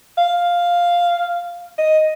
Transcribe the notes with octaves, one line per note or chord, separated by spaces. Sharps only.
F5
D#5